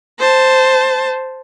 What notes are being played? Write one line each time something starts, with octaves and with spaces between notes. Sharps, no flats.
C5 A5